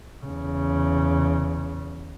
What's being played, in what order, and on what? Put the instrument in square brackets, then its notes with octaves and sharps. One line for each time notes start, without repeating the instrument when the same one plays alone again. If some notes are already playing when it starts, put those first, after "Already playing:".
[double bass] E2 C#3